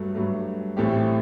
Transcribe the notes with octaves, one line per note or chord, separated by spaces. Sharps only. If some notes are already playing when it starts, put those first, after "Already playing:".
Already playing: G2 F#3 A3
G2 F#3 A3
A1 A2 A3 C4 G4